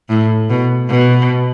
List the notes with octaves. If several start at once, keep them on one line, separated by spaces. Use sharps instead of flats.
A2
B2
B2